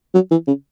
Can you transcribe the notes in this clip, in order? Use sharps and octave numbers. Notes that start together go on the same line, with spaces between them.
F#3
E3
C#3